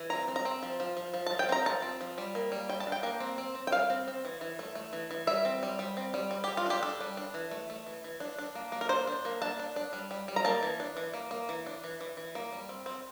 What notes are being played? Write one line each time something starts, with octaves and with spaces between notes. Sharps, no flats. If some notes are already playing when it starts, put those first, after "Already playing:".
Already playing: E3
C4 A#5
C4
A#5
C4
F3
F3
F3
F3
F3 A5
G5
C4 A#5
F3 A5
C4
F3
G3
A#3
G3
G3 G5
A5
D4
G5
A#3
C4
C4
C4
G5
G3 F5
C4
C4
E3
E3
A3
A3
E3
E3
G3 E5
C4
G3
G3
C4
G3
G3
G4
G3
F4
D4 G4
D4 A4
G3
D4
E3
A3
A3
E3
E3
D4
D4
A#3
A#3
A#4
D4 C5
D4
A#3
D4 A5
D4
D4
G3
G3
G3
A#5
A#3 A5
E3
D4
E3
A#3
A#3
E3
D4
E3
E3
E3
A#3
G3
C4
C4